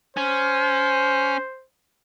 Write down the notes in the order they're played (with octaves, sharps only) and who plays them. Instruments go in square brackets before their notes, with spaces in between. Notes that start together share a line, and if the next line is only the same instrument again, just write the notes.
[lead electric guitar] C#4 [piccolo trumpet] C5